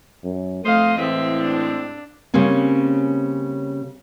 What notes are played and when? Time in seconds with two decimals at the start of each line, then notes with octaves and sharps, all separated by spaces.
0.24 F#2
0.65 F2 A3 C5 D#5 F5 D#6
0.97 A2 E3 G#3 C4 E5
1.42 D4
2.34 C#3 G3 A#3 C4 C#4